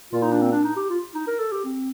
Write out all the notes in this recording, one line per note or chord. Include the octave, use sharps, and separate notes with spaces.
A#2 F4
D#4
D4
C4
D4
D#4
G4
F4
D#4
A#4
A4
G4
C4